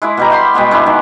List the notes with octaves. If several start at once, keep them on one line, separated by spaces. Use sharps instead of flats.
G#3 E4 D6
B2 G3 A#5
E5 G5 B5 C6
B2 G3 G#3 B3
G#3 D4 E4
D#3